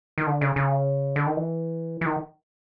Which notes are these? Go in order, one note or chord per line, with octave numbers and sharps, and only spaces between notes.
D#3
D3
C#3
C#3
D3
D#3
E3
E3
D#3